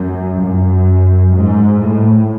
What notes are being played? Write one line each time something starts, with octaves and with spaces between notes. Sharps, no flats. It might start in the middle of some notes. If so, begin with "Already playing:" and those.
Already playing: F#2
F#2
G#2
A2